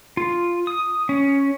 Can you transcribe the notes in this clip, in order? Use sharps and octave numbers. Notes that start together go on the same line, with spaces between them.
F4
D#6
C#4